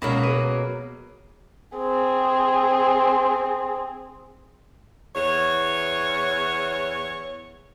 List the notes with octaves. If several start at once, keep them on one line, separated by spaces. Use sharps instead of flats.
C#2 B2 F#3 A#3 A#4
G#4 B4 D#7
C4 G#4
E2 C#5